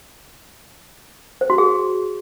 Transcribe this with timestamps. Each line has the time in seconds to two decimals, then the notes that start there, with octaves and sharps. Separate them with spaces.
1.41 C5
1.50 F#4
1.58 G#4